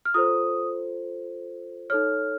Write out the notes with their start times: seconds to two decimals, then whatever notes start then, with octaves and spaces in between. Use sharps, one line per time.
0.05 F6
0.14 F4 A4 C5 D#6
1.90 D#4 A4 C#5 F6